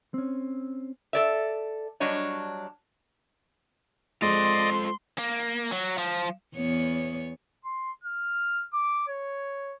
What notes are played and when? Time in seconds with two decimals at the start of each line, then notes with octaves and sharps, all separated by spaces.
0.14 C4 C#4
1.13 A4 D5 E5
2.00 F#3 G3 D4 C#5 D#5
4.22 G#3 F4 A4 C5 D5 D#5 C6
5.18 A#3
5.71 F#3
5.98 F3
6.55 E2 B3 C#5
7.65 C6
8.04 F6
8.73 D6
9.08 C#5